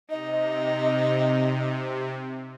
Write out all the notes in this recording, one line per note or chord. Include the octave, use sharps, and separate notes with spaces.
C3 D#4 D#5